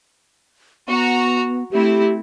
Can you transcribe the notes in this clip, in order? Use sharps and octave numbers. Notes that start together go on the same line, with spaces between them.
B3 F#4 A#5
A3 C4 E4 G4